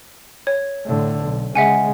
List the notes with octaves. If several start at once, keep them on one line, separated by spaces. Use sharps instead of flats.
C#5
A2 D3
B1
C#3 G#3 E5 F#5 G#5